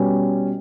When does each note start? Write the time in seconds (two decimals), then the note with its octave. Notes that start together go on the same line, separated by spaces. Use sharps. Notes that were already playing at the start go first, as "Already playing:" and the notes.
Already playing: B2 G3 C#4